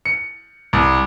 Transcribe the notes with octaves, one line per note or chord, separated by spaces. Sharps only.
C#7
C2